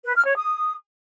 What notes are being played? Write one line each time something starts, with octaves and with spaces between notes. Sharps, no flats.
B4
F6
C#5
D#6